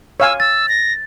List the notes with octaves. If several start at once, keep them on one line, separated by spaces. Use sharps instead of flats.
C#5 F5 G#5 E6
E6 A6
A#6